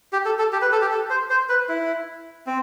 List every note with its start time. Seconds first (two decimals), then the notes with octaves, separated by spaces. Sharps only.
0.13 G4
0.25 A4
0.39 A4
0.53 G4
0.62 B4
0.72 A4
0.81 G4
0.91 A4
1.10 C5
1.30 C5
1.49 B4
1.69 E4
2.47 C4